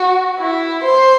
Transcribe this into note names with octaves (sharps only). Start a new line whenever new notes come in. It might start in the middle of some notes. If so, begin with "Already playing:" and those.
Already playing: F#4
E4
C5